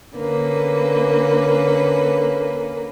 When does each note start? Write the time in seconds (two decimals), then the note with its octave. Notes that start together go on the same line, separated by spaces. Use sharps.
0.16 D3 A#3 C#4 B4